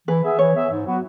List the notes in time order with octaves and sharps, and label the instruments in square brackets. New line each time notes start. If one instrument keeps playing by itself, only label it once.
[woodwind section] E3 [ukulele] B4
[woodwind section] B3 G#4 E5
[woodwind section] E3 [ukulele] C#5
[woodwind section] B3 G#4 E5
G#2
F#3 B3 F#4